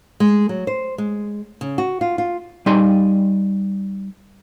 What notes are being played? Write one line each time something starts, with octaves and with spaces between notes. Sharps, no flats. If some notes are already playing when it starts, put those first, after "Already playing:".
G#3
F#3
C5
G#3
C#3
F#4
F4
F4
G3 D#4 D5 G#5 C6